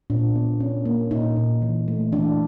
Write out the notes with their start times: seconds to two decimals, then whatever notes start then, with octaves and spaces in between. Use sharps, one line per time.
0.10 A#2 D4
0.35 B3
0.60 C#4
0.85 A#3
1.11 A#2 D#4
1.37 A#2
1.62 E3
1.88 A3
2.12 E3 D4